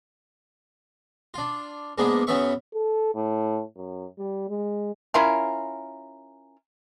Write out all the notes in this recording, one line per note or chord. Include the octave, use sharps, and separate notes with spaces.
D4 F4
G#2 G#3 A#3 B3 D4
F#2 C#3 B3 E5 C#6
A4
A2
F#2
G3
G#3
C#4 E4 F4 A#4